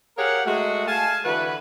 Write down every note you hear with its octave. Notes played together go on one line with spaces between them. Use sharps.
G4 G#4 A#4 C#5 F5 F#5
G#3 A3 F#4
F5 G#5 A5
D3 E3 F#4 B4